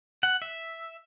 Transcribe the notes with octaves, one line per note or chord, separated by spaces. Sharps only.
F#5
E5